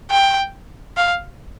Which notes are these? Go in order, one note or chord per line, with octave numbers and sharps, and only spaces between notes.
G5
F5